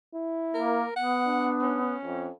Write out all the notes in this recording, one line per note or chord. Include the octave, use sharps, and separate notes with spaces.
E4
A#3 A#4
B3 F#5
D4
C#4
F2